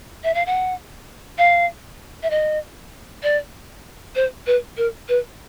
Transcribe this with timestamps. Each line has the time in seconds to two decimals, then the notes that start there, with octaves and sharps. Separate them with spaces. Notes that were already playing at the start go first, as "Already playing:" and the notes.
0.24 E5
0.34 F5
0.46 F#5
1.38 F5
2.23 E5
2.30 D#5
3.23 D5
4.15 C5
4.47 B4
4.77 A#4
5.09 B4